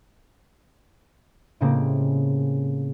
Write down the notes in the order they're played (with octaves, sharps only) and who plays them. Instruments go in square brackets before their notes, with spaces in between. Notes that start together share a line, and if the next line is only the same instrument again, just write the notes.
[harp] A2 C#3 G#3 A#3 C4 G4